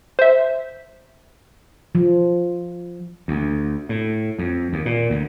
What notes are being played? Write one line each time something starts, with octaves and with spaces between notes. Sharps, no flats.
C5 E5
F3
D2
A2
F2
D#2
A#2
D2